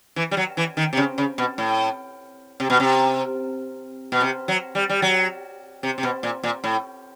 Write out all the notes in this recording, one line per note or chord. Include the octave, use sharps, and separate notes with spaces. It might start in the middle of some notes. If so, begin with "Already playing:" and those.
E3
G3
F#3
E3
D#3
C3
C#3
C#3
B2
A2
C3
B2
C3
B2
C3
F#3
G3
G3
F#3
C3
C3
B2
A#2
A#2
A2